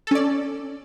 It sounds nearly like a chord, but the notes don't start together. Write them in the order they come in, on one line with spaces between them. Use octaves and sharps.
A4 C#4 D5